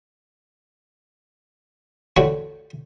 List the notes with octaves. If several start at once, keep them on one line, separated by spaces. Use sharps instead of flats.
A1 D3 F#4 C#5 G5 C#6